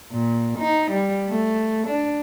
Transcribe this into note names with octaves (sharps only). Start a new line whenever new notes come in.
A#2
D#4
G3
A3
D4